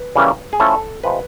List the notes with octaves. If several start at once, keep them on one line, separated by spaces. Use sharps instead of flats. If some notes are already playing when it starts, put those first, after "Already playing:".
Already playing: B4
C#3 E3 G3 A#3 C#4
G#4
F3 A3 C#4 E4 A4
C3 F3 G#3 B4